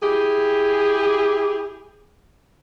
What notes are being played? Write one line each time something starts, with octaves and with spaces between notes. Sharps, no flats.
E4 G4 G#4